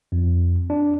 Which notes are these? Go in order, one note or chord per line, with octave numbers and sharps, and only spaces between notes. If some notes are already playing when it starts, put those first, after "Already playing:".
F2
D4